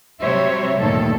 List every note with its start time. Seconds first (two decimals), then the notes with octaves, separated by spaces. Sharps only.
0.20 C3 F#3 G3 C5 C#5 E5
0.78 D2 G2 A#2 D#3 A4